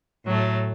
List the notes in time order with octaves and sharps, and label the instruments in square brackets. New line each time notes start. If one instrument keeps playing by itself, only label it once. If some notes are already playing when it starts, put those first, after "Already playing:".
[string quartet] A2 F#3 A3